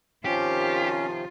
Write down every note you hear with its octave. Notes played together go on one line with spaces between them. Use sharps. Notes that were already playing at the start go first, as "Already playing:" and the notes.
C3 D#3 F3 C#4 F4 G4